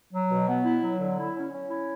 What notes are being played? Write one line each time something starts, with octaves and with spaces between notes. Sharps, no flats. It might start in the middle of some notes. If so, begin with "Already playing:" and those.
F#3
B2
B3
E4
F#3
D3
E4
C#4
C#4
E4